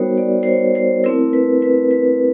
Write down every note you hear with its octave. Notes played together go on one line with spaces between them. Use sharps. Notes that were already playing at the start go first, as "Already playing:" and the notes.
Already playing: G3 B3 D#4 F#4 A#4 C5 C#5
D5
C5
C#5
C5
A3 C4 E4 A#4
B4
B4
B4